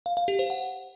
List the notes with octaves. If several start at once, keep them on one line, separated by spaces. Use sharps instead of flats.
F5
F5
G4
C5
F#5